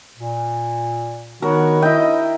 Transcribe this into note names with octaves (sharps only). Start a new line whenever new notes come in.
A#2
D#3 B3 F#4 A#4 C#5
E4 D#5 G5